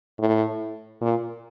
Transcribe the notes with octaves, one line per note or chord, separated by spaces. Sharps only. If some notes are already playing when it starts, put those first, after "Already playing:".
A2
A#2